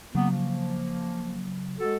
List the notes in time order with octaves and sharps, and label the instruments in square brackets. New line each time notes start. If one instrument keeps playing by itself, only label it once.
[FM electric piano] C#3 F#3 [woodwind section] A#3 B3
[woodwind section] F3 A#3
G#3 F#4 A4